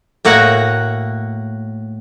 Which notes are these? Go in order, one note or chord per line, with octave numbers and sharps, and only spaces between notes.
A2 A#3 F#4 F#5 G#5 A#5